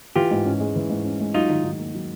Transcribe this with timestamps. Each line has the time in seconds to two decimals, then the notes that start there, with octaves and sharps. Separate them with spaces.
0.16 E3 F4 G4
0.31 G#2
0.45 C#4
0.60 G#3
0.76 E3
0.90 G#2
1.04 C#4
1.20 G#3
1.34 F#3 D#4 F4
1.50 D#3
1.64 D#3
1.79 A#3
1.94 F#3